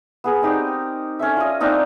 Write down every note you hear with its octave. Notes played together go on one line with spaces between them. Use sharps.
B3 G#4 A#4
C4 D#4 G4
C#4 A4 E5
F4 D#5
A#3 C4 D4 D#4